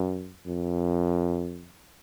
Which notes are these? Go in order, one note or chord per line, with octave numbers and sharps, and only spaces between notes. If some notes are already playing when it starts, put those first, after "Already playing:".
Already playing: F#2
F2